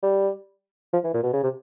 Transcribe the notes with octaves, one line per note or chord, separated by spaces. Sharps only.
G3
F3
E3
A#2
B2
C#3
C3